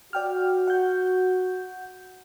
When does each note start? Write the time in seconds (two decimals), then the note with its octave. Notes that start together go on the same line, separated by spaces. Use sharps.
0.13 F#4 D5 G5 F6
0.68 F#5 G6